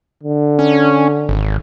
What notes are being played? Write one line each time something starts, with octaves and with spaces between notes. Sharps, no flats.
D3
C#4
G#1